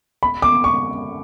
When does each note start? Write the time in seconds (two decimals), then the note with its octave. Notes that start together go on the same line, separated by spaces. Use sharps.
0.23 B5
0.42 D6
0.64 C#6